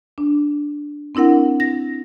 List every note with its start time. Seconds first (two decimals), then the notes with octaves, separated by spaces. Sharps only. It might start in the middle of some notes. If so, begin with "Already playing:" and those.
0.18 D4
1.15 C4 D4 E4 A#4 F#5
1.60 A#6